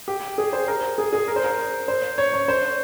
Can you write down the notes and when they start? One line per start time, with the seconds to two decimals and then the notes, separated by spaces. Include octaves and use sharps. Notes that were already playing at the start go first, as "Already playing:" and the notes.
0.08 G4
0.38 G#4
0.53 C5
0.68 A#4
0.98 G#4
1.13 G#4
1.28 A#4
1.36 C5
1.44 A#4
1.88 C5
2.18 C#5
2.33 C#5
2.48 C5